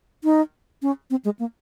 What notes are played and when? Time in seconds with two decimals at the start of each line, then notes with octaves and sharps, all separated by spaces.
0.24 D#4
0.82 C#4
1.10 C4
1.25 G#3
1.39 A#3